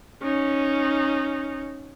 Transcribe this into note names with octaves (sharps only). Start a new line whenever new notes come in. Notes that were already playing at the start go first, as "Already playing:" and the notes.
C#4 D#4